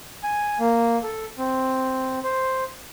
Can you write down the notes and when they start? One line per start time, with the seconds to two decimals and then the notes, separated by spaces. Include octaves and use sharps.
0.23 G#5
0.60 A#3
1.03 A4
1.38 C4
2.24 C5